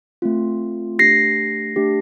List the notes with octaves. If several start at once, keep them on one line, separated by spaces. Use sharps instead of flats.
A3 C4 F4
A3 D4 G4 A#6 C7
A3 D4 G4